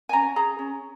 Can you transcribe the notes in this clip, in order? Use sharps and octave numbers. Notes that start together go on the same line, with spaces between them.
G#5
C#4 A#5
G#4 A#5
C#4